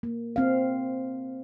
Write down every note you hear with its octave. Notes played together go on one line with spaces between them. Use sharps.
A#3
C4 F5